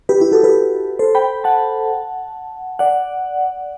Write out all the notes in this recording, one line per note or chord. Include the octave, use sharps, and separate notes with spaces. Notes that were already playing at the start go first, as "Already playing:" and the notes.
G4 B4
E4 G4
F#4 A4
G4 B4
A4 C5
G5 B5
F#5 A5
D5 F#5